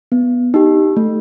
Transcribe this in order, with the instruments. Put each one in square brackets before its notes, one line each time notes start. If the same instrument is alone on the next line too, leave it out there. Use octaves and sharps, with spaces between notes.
[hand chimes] B3
D#4 G4
A3